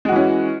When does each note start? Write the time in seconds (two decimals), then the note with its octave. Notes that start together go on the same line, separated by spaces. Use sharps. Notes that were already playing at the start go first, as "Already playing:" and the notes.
0.05 G#3
0.09 F#4
0.12 E3
0.16 C#4